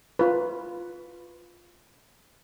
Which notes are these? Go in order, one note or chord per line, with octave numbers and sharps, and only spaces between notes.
F4 B4